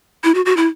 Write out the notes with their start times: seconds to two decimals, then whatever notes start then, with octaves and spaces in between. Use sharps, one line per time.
0.24 E4
0.35 F#4
0.46 F#4
0.57 E4